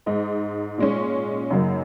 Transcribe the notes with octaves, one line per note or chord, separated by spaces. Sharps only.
G#2 G#3 D#4
A#2 G#3 C#4
F#2 C#3 F#3 A#3 D#4